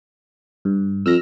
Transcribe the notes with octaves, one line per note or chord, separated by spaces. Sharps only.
G2
F2 E6 F6 A#6